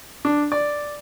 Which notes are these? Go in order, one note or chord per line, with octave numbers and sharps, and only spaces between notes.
D4
D5